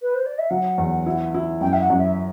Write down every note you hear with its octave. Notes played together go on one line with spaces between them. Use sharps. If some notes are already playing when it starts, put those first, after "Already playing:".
B4
C5
D5
E5
F#3 F#5
E2
E4
E4
F#2 G5
E5
F#5
F#2
E5